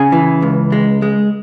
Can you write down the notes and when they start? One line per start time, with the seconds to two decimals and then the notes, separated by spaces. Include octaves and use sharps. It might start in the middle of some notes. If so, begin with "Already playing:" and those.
Already playing: C#3 G#4
0.12 E3
0.42 C#2
0.72 G#3
1.02 G#3